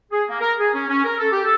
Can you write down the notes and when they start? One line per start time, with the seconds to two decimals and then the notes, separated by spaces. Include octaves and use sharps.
0.12 G#4
0.29 A#3
0.40 A#4
0.58 G#4
0.73 C#4
0.88 C#4
1.04 A#4
1.18 A4
1.32 G4
1.44 A4